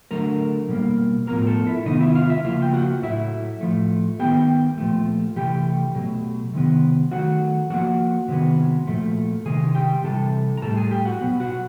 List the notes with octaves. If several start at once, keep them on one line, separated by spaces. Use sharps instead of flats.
D3 F#3 A3 A#4 A#5
B2 G3 A#3
A2 F3 G#3 B3 A#4 A#5
A4 A5
E4 E5
C3 D#3 G#3 B3 D#4 D#5
E4 E5
F4 F5
E4 E5
C#3 F3 A#3 F4 F5
G5
F#4 F#5
A2 F#3 A3 E4 E5
A2 F3 A3
D#3 G#3 B3 G4 G5
A#2 F3 A3
C3 E3 A3 G4 G5
B2 F#3 A3
C3 D#3 G#3 B3
D#3 F#3 A3 F#4 F#5
A2 F3 A#3 F#4 F#5
C3 D#3 G#3 B3
A#2 F3 A3
C3 D#3 G#3 G#4 G#5
G4 G5
C3 E3 G3 A4 A5
A#5
A2 E3 G3 A4 A5
G#4 G#5
G4 G5
F#4 F#5
B2 F#3 B3
F#4 F#5